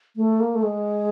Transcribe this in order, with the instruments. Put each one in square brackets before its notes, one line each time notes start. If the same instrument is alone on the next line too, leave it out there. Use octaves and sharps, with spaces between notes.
[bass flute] A3
A#3
A3
G#3